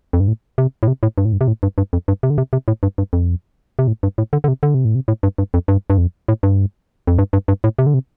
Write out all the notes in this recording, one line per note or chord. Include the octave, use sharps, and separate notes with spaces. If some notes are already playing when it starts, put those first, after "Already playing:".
F2
G2
A2
C3
A2
C3
A2
G2
A2
G2
C3
A2
G2
G2
F2
G2
C3
D3
C3
C3
A2
G2
G2
F2
C3
A2
G2
A2
D3
D3
C3
D3
C3
A2
C3
A2
G2
G2
F2
G2
G2
F2
A2
G2
F2
G2
G2
G2
A2
C3
D3
C3